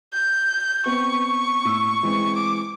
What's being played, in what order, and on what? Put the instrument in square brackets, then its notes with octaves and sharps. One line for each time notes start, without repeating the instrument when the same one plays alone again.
[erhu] G6
[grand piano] B3 C4 [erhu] C#6
[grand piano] A2 E6
E3 G#3 C4
[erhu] D6